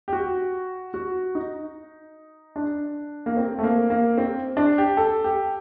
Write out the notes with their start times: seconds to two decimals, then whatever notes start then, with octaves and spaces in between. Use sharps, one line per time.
0.08 G4
0.13 F#4
0.94 F#4
1.35 D#4
2.56 D4
3.26 A#3
3.37 C4
3.59 A3
3.63 A#3
3.90 A#3
4.18 C4
4.57 D4
4.78 G4
4.97 A4
5.24 G4